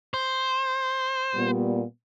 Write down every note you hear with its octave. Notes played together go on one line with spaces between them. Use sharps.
C5
A#2 G3 B3